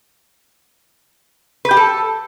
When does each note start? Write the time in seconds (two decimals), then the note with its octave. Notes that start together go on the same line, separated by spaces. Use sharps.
1.65 B4
1.71 G4
1.77 A4